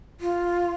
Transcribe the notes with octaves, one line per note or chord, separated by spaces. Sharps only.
F4